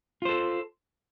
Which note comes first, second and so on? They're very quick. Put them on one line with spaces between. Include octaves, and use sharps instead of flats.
F4 C5 A4